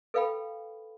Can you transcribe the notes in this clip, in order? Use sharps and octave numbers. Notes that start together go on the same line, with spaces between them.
A4 B4 F5 G5 B5